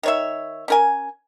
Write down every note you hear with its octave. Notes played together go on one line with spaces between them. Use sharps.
D#3 C#5 E5
C#4 A#4 G#5